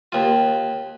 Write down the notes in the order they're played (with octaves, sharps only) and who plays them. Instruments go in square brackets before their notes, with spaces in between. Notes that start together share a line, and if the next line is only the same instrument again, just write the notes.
[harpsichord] D#2 F4